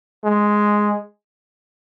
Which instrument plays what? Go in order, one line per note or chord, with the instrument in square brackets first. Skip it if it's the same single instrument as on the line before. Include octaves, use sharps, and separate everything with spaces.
[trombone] G#3